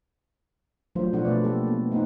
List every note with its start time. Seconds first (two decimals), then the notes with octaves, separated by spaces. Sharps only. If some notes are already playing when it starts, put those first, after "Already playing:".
0.95 F3 F#3 A3 D4 F4 C5
1.13 B2 D4 F4 F#4 A4 F#5
1.25 A3 B4 D5
1.44 A#3 G4 A4
1.67 B3
1.92 A3 C4 D#4 C5 F#5